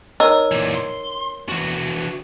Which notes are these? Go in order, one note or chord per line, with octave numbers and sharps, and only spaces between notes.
D#4 A#4 C#5 E6
A#2 E3
C6
E3 F#4